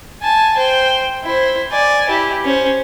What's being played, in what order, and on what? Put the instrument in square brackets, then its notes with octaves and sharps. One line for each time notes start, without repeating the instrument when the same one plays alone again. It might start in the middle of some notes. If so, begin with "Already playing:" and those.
[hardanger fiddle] G#5 A5
C5 G5
E4 C5
D5 G#5
E4 G4
C#4 C5